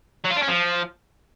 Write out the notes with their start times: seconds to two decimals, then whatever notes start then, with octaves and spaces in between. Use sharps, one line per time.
0.24 F#3
0.30 F4
0.36 D4
0.42 C#4
0.48 F3